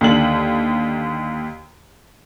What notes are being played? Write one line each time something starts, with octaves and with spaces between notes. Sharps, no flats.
D#2 D3 F#7